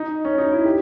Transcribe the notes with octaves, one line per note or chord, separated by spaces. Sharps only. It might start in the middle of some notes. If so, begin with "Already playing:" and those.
Already playing: D#4
C#4
D#4
E4
G4